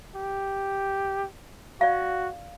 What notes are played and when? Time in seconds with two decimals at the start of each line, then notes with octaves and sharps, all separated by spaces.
0.16 G4
1.81 F#4 D5 F5